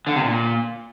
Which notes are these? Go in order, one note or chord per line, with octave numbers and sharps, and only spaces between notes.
D3
C3
A#2